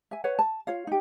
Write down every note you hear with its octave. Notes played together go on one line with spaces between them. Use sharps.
E5 G#5
B4 C#5 F#5
A5
F4 C#5 F5
D#4 G4